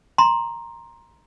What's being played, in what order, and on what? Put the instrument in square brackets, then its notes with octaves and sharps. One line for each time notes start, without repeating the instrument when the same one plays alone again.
[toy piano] A#5 C6